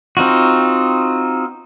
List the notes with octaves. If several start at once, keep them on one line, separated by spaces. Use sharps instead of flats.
C4 D#4 F4 F#4